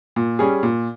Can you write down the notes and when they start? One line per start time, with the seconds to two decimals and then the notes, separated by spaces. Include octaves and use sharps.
0.16 A#2
0.39 G3 C#4 G#4
0.63 A#2